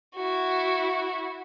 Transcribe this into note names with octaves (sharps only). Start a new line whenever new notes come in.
E4 F#4